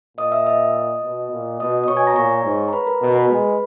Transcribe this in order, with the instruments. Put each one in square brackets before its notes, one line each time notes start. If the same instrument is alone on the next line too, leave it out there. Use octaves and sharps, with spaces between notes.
[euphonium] A#2 [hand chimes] D#5 D#6
[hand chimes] E5 E6
D#5 D#6
[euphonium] B2
A#2
[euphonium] B2 [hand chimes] D#5 D#6
[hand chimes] D#6
[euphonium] B2 [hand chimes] C#5 C#6
[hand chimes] G#5 G#6
A#5 A#6
[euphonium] A#2 [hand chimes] C#5 C#6
[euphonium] G#2
[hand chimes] A#5
B4 B5
A#4 A#5
[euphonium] B2
[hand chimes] B4 B5
[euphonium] G#3